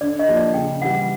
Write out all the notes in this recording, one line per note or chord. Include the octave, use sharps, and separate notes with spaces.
D3 D5
D#5
F3 A#3 D4 G4
D5
C#3 G5
E3 G3 F#5